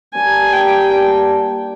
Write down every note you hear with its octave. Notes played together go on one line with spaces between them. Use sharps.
G3 A#3 D4 G4 G#5
G3 A#3 D4 G4 G5
G3 A#3 D4 G4